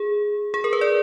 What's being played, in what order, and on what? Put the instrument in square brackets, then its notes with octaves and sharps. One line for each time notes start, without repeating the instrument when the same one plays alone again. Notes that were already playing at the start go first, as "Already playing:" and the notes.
Already playing: [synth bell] G#4
G#4
A#4
B4
D5